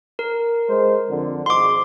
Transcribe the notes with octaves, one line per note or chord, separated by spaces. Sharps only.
A#4
G#3 C5
F2 D3
G#1 G#2 C6 D6